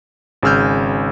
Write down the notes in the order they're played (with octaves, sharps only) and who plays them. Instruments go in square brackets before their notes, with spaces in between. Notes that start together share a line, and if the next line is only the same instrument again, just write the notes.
[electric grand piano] G#1 C#3 G#4 E6 F6 G6